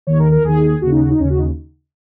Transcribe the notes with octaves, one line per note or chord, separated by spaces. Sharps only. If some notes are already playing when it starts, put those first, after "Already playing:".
D#2 D#3 C#5
A#4
A#4
D#2 D#3 G#4
D#2 C#3 F#4
D#4
F#4
D#4
D#2 C#3 C#4
F#4
D#4